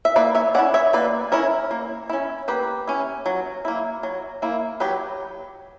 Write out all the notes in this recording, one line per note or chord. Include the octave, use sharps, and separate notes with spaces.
E5
A#3 B4 D5
C#5 E5
C#4 E4 D5 F#5
C#5 E5
A#3 B4 D5
C#4 E4 A#4 C#5
A#3
C#4 E4
A#3 G4 B4
C#4 E4
F#3
A#3 E4
F#3
A#3 E4
F#3 G4 B4